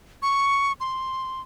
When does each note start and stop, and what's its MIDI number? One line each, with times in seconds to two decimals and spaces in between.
0.22 0.73 85
0.80 1.41 84